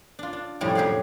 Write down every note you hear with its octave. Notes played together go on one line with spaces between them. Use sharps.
D4 F4
D4
F2 A2 C3 G3 C4 C#4
F2 F#3 G4 G#4 F5 F#5